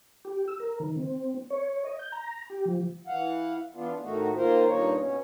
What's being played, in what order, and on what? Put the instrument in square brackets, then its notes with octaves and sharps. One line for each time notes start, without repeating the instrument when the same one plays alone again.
[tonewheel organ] G4
E6
A#4
D#3
C4
C#5
D#5
G6
A#5
G4
F3
[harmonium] E3 F5 F#5
E3 B3 D4 F4
A2 D#3 A3 D#4 F#4
D#3 A#3 F4 A#4 C5
G2 A#2 A#3 D#4 C#5
B2 C#4